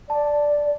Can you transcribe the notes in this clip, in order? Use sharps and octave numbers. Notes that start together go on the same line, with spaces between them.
D5 A5